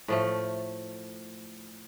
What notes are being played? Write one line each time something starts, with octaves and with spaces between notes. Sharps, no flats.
A2 F3 A3